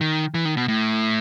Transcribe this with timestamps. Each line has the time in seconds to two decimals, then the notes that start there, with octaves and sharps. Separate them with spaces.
0.01 D#3
0.34 E3
0.45 D#3
0.57 B2
0.68 A2